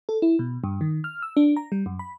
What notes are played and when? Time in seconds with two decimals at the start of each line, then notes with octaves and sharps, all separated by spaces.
0.09 A4
0.22 E4
0.39 B2
0.64 G2
0.81 D#3
1.04 F6
1.22 E6
1.37 D4
1.57 A#5
1.72 G3
1.86 F#2
1.99 B5